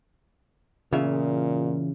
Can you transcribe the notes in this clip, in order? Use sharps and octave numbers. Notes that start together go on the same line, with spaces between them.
E2 A#2 C#3 F4 E5